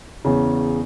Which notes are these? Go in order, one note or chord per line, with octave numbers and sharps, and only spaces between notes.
E2 C#3